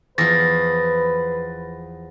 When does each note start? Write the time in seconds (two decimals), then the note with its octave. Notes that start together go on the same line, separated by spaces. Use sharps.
0.18 E2 F3 B4 A6 A#6